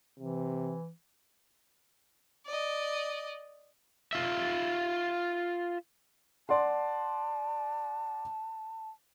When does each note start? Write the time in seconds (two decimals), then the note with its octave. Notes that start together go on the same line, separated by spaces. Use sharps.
0.19 C3 E3
2.46 D5 D#5
4.13 F4 E5
6.49 D5 F#5 A5 C6